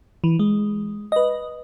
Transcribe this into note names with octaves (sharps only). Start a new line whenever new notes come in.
E3
G#3
B4 D#5